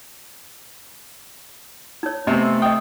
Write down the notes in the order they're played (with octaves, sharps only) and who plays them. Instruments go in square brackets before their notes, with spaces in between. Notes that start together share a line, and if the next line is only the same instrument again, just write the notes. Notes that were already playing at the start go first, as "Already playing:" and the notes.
[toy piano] D#4 C#5
[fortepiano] C3 C4 [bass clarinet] A3 [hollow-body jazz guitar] B3 [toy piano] D#5 G#5
[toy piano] D#5 D#6 [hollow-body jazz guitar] G5